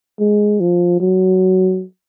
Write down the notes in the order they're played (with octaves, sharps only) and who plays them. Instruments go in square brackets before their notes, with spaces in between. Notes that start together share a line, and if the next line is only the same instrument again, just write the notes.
[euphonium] G#3
F3
F#3